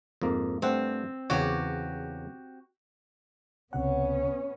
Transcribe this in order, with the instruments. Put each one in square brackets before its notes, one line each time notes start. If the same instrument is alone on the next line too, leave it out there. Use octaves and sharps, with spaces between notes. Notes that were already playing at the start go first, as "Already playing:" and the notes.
[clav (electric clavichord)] F2 G#2 A#3
[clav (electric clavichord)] G2 A3 F#5 [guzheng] C4
[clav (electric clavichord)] E2 C#3 C#5 [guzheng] F#4 G4
[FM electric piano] C#2 C3 F#5 [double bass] B3 C#4